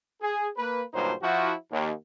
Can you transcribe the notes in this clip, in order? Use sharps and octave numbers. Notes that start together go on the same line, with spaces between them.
G#4
A#3 B4
D2 G2 A#2 F#3 D#4 C5
F3 E4 F#4
D#2